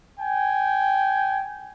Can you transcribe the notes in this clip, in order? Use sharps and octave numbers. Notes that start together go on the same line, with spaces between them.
G5 G#5